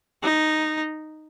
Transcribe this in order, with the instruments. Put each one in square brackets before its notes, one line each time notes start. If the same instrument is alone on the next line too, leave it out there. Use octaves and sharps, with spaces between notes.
[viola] D#4